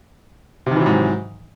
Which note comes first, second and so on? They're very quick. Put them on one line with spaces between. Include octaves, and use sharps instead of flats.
C3 D#3 E3 F#3 G#2